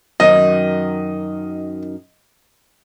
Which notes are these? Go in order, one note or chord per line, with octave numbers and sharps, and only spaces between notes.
F#2 D#3 D#5